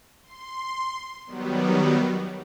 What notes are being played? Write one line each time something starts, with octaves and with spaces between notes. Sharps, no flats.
C6
D#3 F#3 G3 B3